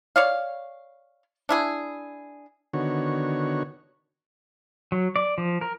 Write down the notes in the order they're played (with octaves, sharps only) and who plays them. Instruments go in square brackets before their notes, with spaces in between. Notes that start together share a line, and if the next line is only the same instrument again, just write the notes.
[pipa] C#5 D5 F5
D4 E4 G#4
[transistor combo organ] D3 D#3 B3 F#4 C#5
[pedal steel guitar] F#3
D5
F3
A#4